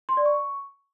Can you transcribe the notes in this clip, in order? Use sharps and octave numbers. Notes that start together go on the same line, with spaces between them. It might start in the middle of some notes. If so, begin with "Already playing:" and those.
C6
D5
C#6